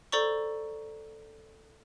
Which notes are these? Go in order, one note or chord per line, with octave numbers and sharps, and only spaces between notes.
A4 C5 D5 A#5 C#6